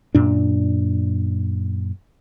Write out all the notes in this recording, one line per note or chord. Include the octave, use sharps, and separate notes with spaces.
F#2 A#2 D4